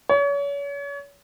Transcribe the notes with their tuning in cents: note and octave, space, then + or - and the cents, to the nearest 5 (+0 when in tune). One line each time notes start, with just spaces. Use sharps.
C#5 +35